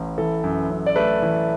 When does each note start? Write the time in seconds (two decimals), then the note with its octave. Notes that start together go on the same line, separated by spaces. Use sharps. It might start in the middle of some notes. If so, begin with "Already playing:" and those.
Already playing: A1 A2
0.18 E3 A4
0.44 F#2
0.70 F#2
0.86 D5
0.96 A3 B4
1.22 E3